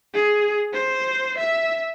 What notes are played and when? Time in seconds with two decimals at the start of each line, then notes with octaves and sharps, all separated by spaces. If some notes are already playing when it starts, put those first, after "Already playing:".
0.14 G#4
0.74 C5
1.38 E5